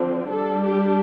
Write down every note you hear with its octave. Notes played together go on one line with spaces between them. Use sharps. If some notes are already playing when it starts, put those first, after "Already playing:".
Already playing: D3 F3 C4
G3 D4 A4
G4